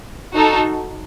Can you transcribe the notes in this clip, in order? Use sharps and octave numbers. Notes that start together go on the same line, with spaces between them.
D#4 F#4 A4